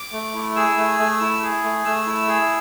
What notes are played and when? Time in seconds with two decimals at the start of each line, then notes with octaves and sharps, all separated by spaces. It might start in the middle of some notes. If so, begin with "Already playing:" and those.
Already playing: D6
0.13 A3
0.34 E4
0.56 G#4 E6
0.77 A3
0.99 A3
1.21 E4
1.43 G#4
1.64 A3
1.85 A3 E6
2.06 E4
2.28 G#4